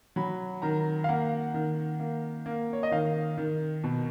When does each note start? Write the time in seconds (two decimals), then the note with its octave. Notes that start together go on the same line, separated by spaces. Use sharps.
0.16 F#3 B5
0.62 D#3 A#5
1.04 F5
1.09 A#3 F#5
1.54 D#3
2.00 A#3
2.46 A#3
2.73 C#5
2.83 D#5
2.91 D#3 F5
3.37 D#3
3.84 B2